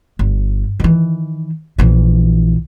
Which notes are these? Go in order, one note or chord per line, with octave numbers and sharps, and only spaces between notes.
G1
D#3 E3
A#1 E3